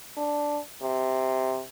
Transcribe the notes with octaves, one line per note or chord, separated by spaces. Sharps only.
D4
C3